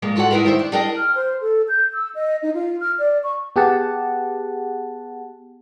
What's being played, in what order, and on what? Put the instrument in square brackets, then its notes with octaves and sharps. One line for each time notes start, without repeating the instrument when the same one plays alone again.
[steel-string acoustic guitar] A#2 F3 G#3 A#3
F4 F#4 A4 C#5 F#5
G#3 E4 A#4 B4 F5
G#2 D#3 C5 E5
D4
D4 G#4 A#4 D#5 G5
[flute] F6
C5
A4
G6
E6
D#5
D#4
F4
F6
D5
C#6
[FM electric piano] B3 G4 G#4 F#5 A5